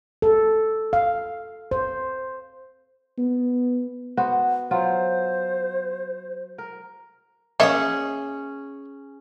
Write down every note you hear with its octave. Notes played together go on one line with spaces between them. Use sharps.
A4
F5
C5
B3
B3 F#4 C5
F#3 F4 C5
A#4
A#3 C#4 G#4 C#5 D#5 E5